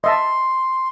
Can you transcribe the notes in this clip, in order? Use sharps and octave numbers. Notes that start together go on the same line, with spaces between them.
D#5 E5 A5 C6